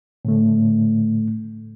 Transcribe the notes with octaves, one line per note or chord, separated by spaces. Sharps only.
A2 D3 A3